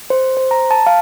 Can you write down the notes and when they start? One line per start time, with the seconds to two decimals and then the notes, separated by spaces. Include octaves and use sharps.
0.10 C5
0.37 C5
0.51 A#5
0.71 A5
0.87 F5